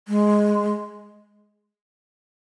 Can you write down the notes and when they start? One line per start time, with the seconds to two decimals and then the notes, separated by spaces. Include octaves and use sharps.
0.08 G#3